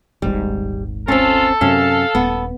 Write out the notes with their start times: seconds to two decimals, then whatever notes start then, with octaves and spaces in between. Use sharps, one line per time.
0.22 D#1 G#1 G#2 G3
1.08 C4 C#4 F4 A4
1.61 F#2 C3 C#4 F5
2.15 D#1 B3